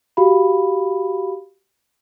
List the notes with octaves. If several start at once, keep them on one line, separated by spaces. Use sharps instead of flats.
F#4 G4 F5 B5